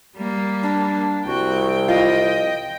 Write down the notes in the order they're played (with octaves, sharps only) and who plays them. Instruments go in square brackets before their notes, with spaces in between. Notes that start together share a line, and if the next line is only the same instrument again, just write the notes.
[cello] G3 A#3
[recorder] D4
[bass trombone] C2 [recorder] F#4 [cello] G5
[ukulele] F4 [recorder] D#5